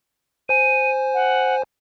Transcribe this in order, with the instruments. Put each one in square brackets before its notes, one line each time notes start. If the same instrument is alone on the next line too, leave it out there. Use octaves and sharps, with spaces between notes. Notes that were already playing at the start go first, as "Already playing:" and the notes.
[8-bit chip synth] C5 G#5 [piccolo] D#7
[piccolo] F#5